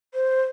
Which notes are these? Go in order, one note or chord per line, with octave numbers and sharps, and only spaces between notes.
C5